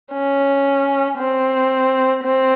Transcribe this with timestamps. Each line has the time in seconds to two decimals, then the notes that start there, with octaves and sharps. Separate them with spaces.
0.12 C#4
1.18 C4
2.24 C4